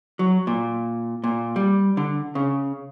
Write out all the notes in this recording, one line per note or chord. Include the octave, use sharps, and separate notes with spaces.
F#3
A#2
A#2
G3
D3
C#3